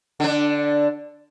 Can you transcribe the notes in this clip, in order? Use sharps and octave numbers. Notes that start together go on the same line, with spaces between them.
D3 D4